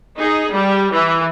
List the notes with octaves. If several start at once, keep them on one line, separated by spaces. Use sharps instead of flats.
D#4 G#4
G3
E3